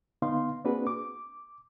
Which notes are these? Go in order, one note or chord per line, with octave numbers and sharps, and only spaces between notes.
D3 B3 D#4 F5 C6
A#3 C4 D4 F#4 G#4 B4
D6